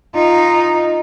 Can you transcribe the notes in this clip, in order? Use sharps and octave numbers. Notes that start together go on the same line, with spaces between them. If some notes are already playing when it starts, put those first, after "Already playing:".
D#4 F4